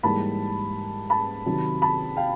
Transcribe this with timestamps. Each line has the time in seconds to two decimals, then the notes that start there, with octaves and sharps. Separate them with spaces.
0.03 G#2 E3 G3 A#3 A5 B5
1.10 A5 B5
1.46 C3 D#3 F#3
1.82 A5 B5
2.17 F5 G5